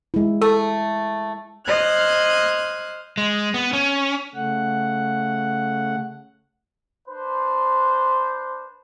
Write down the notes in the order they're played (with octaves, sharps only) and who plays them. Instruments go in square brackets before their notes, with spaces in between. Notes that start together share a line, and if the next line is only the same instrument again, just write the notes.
[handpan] G#3 E4
[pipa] A3 [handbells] A4
[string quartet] C5 D#5 F6 F#6 G#6
[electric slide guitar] G#3
B3
C#4
[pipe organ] C#3 A3 F#5
[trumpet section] D4 B4 C5